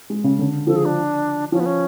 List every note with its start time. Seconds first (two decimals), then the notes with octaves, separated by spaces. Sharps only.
0.10 G#3
0.24 C#3
0.39 D3
0.67 F3 A4
0.76 G#4
0.85 D4
1.52 F3 C#4
1.60 B3
1.66 C#4